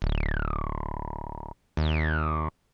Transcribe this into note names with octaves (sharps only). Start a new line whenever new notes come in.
D1
D#2